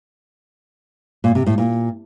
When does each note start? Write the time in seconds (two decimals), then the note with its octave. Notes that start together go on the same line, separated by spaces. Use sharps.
1.24 A#2
1.35 C3
1.47 A2
1.58 A#2